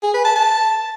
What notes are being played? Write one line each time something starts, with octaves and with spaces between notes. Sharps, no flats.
G#4
B4
A5
A5